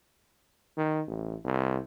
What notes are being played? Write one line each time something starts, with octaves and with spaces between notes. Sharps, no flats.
D#3
A1
C2